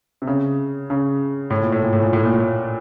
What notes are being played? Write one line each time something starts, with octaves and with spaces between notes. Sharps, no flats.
C3
C#3
C#3
A2
A#2
A2
A#2
A2
A#2
A2
A#2
A2